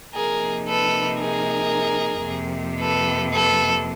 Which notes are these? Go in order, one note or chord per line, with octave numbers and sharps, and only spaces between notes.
C3 F3 A#3 D#4 G#4 A#4
A4 B4
G#4 A#4
F2 C3 F3 A#3
A4 B4
A4 B4